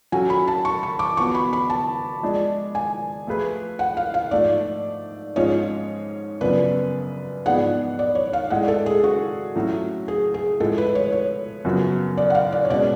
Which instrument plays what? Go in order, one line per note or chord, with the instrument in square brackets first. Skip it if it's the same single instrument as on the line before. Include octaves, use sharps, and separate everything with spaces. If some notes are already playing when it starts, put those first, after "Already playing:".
[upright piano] F#3 C#4 F#4 A4 [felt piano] G#5
[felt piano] B5
A5
C#6
C#6
D6
[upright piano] F3 B3 F#4 [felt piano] C#6
[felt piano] B5
B5
A5
[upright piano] F3 G#3 D4
[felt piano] G#5
[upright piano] F3 A3 F4 G#4 B4
[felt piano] F#5
F5
F5
[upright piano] G#2 F3 A3 D4 [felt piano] D5
[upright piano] G#2 F3 G#3 C#4 F4 [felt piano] C#5
[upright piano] F#2 C#3 F3 B3 D4 [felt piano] B4
[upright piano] G#2 F3 B3 D4 G#4 [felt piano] F#5
[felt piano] D5
C#5
F5
[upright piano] A2 G#3 D4 [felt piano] F#5
[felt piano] A4
G#4
F#4
[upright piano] A2 F#3 A3 C#4 F#4
[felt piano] G#4
G#4
[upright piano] A2 F3 G#3 [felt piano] A4
[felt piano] B4
C#5
C#5
[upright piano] F#2 C#3 F3 B3 F#4
[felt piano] D5
F#5
F5
D5
C#5
[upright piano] B2 G#3 C#4 [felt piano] D5